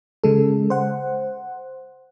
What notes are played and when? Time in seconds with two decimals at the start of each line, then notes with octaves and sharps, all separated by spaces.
0.24 C#3 G#3 A4
0.70 C5 F#5